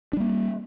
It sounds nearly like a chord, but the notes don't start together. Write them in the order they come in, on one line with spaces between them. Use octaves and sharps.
D4 G3 A#3